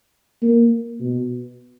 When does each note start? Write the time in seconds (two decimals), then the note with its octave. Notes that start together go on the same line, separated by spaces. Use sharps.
0.42 A#3
1.00 B2